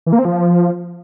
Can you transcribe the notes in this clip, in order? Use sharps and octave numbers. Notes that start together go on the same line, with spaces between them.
E3
A#3
C4
F3